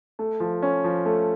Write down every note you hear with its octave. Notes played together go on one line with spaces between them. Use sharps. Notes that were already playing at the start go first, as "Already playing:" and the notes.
A3
F3
C#4
F3
A3